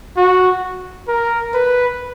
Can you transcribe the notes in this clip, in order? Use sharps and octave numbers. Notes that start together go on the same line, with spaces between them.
F#4
A#4
B4